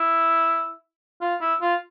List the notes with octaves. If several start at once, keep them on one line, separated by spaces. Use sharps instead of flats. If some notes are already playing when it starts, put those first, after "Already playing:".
Already playing: E4
F4
E4
F4